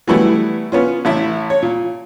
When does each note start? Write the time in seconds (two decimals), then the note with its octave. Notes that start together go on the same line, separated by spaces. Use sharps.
0.07 E3 F#3 G3 A3 B3 E4
0.72 B3 C#4 F4
1.05 A1 E4 E5
1.50 C#5
1.62 A#2